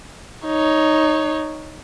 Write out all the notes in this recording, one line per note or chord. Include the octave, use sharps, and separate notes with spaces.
D#4 C#5